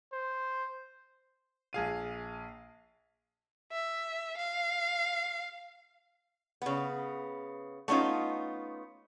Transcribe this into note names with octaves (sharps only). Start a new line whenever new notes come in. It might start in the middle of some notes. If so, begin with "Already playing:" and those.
C5
A#1 G#4 F5 D#7
E5
F5
C#3 B3
A3 B3 C#4 D#4 F4